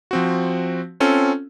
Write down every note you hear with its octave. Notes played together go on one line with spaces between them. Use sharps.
F3 C4 F#4
C4 C#4 F4 A4